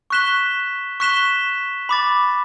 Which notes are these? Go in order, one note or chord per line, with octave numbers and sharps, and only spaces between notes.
C#6 F#6 B6 E7 G7
C#6 F#6 B6 E7 G7
B5 D6 A6